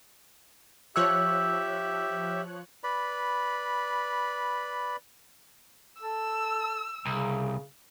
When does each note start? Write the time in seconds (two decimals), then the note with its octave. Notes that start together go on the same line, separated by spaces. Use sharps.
0.96 F3 G4 C#5 E5 E6 F#6
2.84 B4 D5 B5
6.02 A4 E6
7.05 C2 C#3